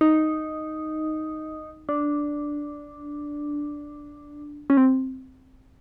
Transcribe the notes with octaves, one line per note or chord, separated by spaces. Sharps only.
D#4
D4
C#4
C4